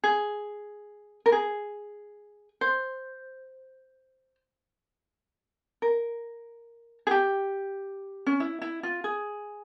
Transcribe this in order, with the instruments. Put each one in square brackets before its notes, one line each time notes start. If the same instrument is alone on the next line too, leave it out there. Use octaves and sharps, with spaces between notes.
[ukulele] G#4
A#4
G#4
C5
A#4
G#4
G4
C#4
E4
E4
F4
G#4